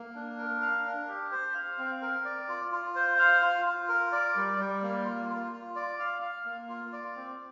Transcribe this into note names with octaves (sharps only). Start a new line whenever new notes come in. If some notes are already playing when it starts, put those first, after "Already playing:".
Already playing: A#3
D4
A#4
F5
D4
G4
C5
F5
C4
A#4
D5
F4
F4
C5
F5
F4
F4
A#4
D5
G3
G3
A#3
F4
F4
F4
D5
F5
F5
A#3
F4
D5
C4